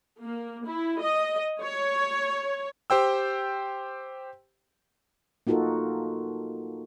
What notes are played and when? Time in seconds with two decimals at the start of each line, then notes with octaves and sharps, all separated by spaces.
0.21 A#3
0.66 E4
1.01 D#5
1.61 C#5
2.90 G4 C5 G5 E6
5.47 A#3 D#4 F4 F#4 A4 A#4